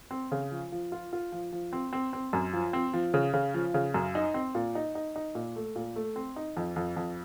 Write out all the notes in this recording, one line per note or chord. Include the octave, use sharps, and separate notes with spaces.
C4
C#3
F3
F3
F4
F4
F3
F3
C4
C4
C4
F#2
F3
C4
F3
C#3
C#3
F3
C#3
F#2
D#4
C4
A#2
D#4
D#4
D#4
A#2
A3
A#2
A3
C4
D#4
F2
F2
F2